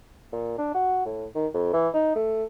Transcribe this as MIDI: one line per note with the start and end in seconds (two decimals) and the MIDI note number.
0.32 0.57 46
0.58 0.70 62
0.74 1.05 66
1.05 1.26 45
1.35 1.47 51
1.54 1.72 41
1.73 1.88 52
1.94 2.13 63
2.15 2.44 57